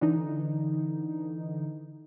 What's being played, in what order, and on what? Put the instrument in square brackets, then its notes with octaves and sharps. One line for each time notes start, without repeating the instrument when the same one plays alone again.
[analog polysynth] D3 E3 D#4